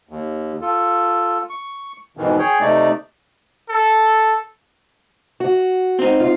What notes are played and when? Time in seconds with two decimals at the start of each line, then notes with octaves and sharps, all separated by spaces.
0.09 D#2
0.61 F4 A4
1.50 C#6
2.17 F2 G#2 B2 D#3 E3
2.39 G#4 C#5 G5
2.60 C3 A3 D#4 D5
3.69 A4
5.40 F#4
5.99 C4 D#4
6.20 F4